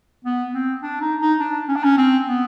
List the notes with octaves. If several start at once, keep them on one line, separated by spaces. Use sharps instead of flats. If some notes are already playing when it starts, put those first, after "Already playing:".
B3
C4
D4
D#4
D#4
D4
C#4
D4
C#4
C4
B3